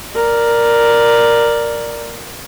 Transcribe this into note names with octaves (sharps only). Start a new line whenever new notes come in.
A#4 D5